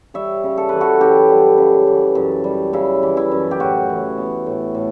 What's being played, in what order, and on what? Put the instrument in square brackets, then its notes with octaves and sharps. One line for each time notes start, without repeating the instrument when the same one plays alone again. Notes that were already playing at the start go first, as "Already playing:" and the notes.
[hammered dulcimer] G3 C#5 E5
C#3
A4
E3 B4
F#4 A4
F#2 E4 G4
G3
C#3
E3
F#2
G3
C#3 E4
E3
E4
F#2
G4
A2 F#4
E3
B3
A2
A2